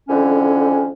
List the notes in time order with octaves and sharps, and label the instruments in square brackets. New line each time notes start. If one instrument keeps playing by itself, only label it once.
[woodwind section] F2 G#2 D3 E3 C#4